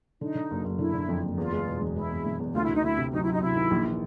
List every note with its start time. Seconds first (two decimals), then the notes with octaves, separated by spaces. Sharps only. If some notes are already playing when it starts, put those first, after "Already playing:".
0.21 D3 D#4
0.35 D3
0.51 F#1
0.65 F#1
0.79 D3 E4
0.94 D3
1.08 F2
1.23 F#1
1.38 E2 F4
1.52 G#3
1.67 B2
1.81 E1
1.95 G#3 E4
2.10 E2
2.25 E1
2.40 E2
2.54 D2 F4
2.63 E4
2.69 D2
2.74 D#4
2.83 D2 E4
2.98 C3
3.12 F#3 D#4
3.22 E4
3.28 F#3 D#4
3.42 C3 E4
3.56 D#3
3.71 A#1
3.85 E3